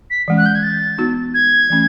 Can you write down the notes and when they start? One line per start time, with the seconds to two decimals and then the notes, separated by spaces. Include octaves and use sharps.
0.10 B6
0.28 E3 G#3 C#4
0.38 F#6
0.46 G6
0.55 G#6
0.63 A6
0.98 B3 D#4 F#4
1.34 G#6
1.70 E3 A3 C#4